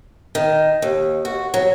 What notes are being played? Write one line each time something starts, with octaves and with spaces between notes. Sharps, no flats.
D#3
D#2
F#4
F#3